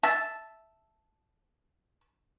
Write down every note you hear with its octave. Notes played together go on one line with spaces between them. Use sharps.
E5 A5